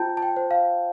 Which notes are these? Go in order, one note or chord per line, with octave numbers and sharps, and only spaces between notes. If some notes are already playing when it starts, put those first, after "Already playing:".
Already playing: F4 C5 G5 A5 G6
A5
G5
C5
F5